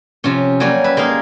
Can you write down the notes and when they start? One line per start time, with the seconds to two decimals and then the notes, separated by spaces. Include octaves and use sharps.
0.24 C3 F3 C#4
0.60 F#3 G3 A#3 C#4
0.84 B4 E5
0.97 G#3 A#3 D#4 F5